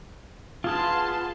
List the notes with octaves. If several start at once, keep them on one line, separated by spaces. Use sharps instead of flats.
B3 F4 G#4 A5 C6 F6